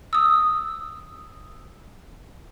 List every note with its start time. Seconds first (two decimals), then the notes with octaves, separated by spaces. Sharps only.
0.13 D#6 E6